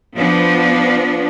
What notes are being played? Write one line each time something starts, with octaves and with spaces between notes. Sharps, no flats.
F3 B3 D4